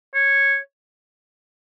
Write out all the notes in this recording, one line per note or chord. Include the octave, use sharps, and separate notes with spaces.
C#5